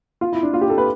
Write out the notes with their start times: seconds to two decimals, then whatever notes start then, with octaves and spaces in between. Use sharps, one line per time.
0.21 F4
0.32 E4
0.43 D4
0.54 F4
0.61 G4
0.70 A4
0.78 B4